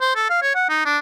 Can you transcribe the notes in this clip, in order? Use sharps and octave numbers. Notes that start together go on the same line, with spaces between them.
C5
A4
F5
C#5
F#5
D#4
D4